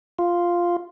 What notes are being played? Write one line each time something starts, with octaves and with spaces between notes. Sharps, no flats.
F4